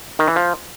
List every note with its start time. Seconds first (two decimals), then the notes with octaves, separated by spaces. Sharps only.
0.19 D#3
0.28 E3
0.36 F3